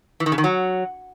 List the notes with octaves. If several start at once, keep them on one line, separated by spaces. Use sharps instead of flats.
E3
D#3
C#3
D#3
F#3